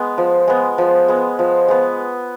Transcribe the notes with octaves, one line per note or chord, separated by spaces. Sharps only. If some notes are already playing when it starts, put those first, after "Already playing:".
Already playing: G#3 B3
F3
G#3 B3
F3
G#3 B3
F3
G#3 B3